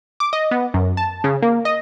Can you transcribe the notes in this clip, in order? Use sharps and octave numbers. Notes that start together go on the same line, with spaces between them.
D6
D#5
B3
F#2
A5
C#3
A#3
D#5